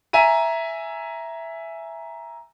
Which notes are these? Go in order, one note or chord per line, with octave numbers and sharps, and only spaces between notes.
E5 G#5 A#5 D#7